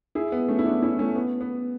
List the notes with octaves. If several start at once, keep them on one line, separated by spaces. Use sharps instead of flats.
E4 G#4
B3
A3 C#4
E4
B3 D4
C#4 E4
A3 C#4
B3
B3